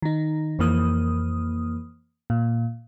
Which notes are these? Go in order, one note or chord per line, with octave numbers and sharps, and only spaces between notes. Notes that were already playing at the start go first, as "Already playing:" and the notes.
D#3 D#4
F2 E3 A#3 D#6
A#2